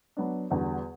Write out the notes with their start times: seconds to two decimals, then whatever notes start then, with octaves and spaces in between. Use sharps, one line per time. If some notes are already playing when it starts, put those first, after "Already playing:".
0.17 F#3 B3 D4
0.50 E2 D3 G3 B3 F#4